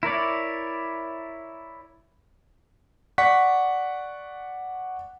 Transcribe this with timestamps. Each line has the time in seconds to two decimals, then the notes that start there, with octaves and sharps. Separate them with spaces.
0.03 E4 A#4 C#5 D5
3.18 D5 F#5 C#6 B6